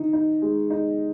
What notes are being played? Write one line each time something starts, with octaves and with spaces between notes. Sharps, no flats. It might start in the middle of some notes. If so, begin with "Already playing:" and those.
Already playing: D#3 D#4
D#4
G#3
D#4